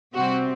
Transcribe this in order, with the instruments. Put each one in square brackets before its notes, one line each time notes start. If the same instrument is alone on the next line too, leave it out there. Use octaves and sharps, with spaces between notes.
[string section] C3 G3 C4 F#4